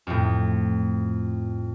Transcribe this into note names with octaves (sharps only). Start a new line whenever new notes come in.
F2 A2